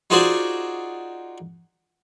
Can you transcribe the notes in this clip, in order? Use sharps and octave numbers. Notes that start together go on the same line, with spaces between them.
D#4 F4 F#4 G#4 C5 D5